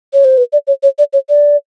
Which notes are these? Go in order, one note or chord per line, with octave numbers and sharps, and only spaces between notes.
C#5
C5
B4
D5
C#5
C#5
D5
C#5
D5